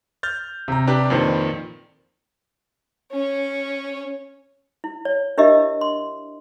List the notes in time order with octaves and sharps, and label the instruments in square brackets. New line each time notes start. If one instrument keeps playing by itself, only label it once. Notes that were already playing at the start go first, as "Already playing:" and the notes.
[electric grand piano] F6 G6 A6
[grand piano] C3 A#5
[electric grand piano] D4 G4 B4
[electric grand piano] F2 A#2 D#3 [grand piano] B4 C5 D5
[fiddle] C#4 C#5
[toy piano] E4
C#5
D4 E4 G4 A#4 D#5 E5
C6